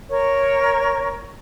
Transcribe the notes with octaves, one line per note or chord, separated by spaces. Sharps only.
A#4 C#5 C#6